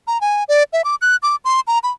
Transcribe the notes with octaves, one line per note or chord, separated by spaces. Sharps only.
A#5
G#5
D5
E5
D6
F#6
D6
C6
A#5
B5